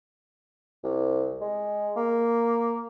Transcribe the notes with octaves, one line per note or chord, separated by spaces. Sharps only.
C2
G#3
A#3